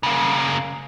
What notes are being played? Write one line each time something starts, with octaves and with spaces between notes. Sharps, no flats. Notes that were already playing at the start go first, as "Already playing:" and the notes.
C#3 A#3